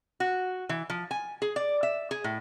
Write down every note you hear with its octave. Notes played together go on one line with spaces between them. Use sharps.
F#4
E3
F3
G#5
G#4
D5
E5
G#4
A2